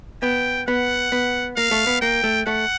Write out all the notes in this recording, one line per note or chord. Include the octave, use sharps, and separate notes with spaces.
B3 G5
B3 F#5
B3
A#3 F5
A3
B3
A#3 G5
A3
A3 F#5